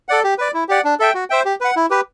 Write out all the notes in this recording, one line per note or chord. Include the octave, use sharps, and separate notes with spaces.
A4 D5 F#5
G4
B4 D5
E4
G4 D5 F#5
D4
A4 E5 G5
F#4
C5 E5 G5
G4
B4 F#5
E4
G4 B4